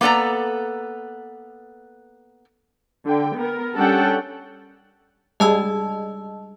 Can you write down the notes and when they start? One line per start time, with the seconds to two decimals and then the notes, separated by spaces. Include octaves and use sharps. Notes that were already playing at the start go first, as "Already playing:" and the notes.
0.01 A#3 B3 A4 D5 A#5
3.06 D3 G5
3.37 B3 A#4
3.77 G3 C#4 D4 A4 F#5 G5
5.40 G3 G#3 G#4 D#5 A5 E6